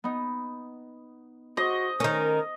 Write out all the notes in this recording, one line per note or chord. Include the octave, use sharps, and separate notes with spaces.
B3 D#4
F#4 C5 D#5
D#3 C#4 A#4